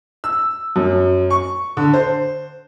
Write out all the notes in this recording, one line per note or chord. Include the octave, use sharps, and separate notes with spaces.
E6
F#2
C#6
D3
C5